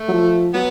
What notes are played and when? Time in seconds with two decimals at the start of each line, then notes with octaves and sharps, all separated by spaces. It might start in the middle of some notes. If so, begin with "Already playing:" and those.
Already playing: A3
0.08 F#3
0.13 F3
0.54 F#3 B3